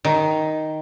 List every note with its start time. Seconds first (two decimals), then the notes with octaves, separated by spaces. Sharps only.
0.05 D#3